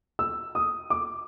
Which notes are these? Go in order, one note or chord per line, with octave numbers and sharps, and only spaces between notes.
E6
D#6
D6